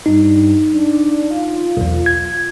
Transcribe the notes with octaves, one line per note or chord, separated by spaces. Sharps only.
G2 D#4
D4
F4
B1 E2
G#6